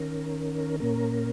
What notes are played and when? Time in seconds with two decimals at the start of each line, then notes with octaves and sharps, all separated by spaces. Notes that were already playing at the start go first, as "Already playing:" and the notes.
Already playing: D#3 C#4 A#4
0.80 A#2 A#3 C#4 A#4